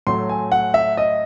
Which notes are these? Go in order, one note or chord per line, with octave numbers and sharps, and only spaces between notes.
A2 F#3 A3 C6
G#5
F#5
E5
D#5